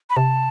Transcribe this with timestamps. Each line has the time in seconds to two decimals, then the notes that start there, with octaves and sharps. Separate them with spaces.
0.10 B5
0.16 C3 A5